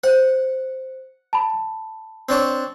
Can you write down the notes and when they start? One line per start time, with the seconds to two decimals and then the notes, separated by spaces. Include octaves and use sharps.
0.04 C5 F#5
1.33 A5 B5
2.29 C4 D4 C#5